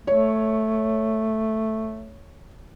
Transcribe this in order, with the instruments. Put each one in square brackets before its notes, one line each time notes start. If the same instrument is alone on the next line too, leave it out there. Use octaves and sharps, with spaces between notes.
[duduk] A3 [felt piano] C#5